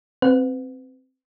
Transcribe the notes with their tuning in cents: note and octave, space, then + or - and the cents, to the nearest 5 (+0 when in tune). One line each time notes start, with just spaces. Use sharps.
C4 +0 B4 +30 F#5 -35